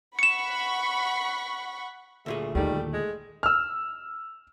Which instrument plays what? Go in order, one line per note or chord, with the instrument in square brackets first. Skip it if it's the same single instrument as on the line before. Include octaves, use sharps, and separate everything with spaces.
[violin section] F#5 B5 C#6 [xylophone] C#7 E7
[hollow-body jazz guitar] D2 A#2 G#4 [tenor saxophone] A3
[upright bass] D#2 [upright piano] D#3 A3 [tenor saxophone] G3
[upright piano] A3
[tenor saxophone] G#3
[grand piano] E6 F6